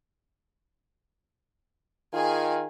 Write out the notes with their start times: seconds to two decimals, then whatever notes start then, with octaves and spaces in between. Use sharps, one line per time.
2.13 D#3 F4 G#4 G#5